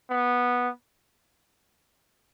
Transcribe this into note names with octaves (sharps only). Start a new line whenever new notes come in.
B3